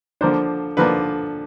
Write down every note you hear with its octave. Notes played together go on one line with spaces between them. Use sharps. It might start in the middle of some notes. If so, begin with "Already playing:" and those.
D3 F3 A#3 D4 C5
D3 F3 A#3 D4 B4